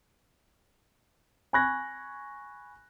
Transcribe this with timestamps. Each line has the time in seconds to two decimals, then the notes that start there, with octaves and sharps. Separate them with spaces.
1.53 G#5 B5 C#6 F#6 G#6 A#6